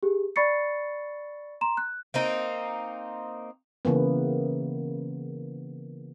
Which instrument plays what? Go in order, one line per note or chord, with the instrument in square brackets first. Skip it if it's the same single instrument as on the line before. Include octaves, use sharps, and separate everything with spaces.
[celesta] G4 G#4
D5 B5 C#6 A6 C7 C#7
A#5 C6 E7
F#6
[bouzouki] A#3 C4 D#4
[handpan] C#3 E3 A#3 B3